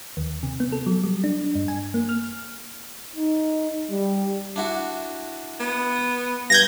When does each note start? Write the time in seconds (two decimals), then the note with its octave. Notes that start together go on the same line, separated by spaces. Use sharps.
0.17 D#2
0.43 C3
0.60 B3
0.72 A4
0.86 F#3
1.04 G3
1.24 D4
1.55 G2
1.68 G#5
1.94 A#3
2.09 F6
3.16 D#4
3.91 G3
4.56 D4 E4 F#4
5.60 B3
6.50 G2 G6 G#6 A#6